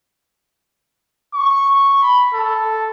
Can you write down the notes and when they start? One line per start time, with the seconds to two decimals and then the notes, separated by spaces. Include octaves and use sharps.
1.34 C#6
2.02 B5
2.34 A4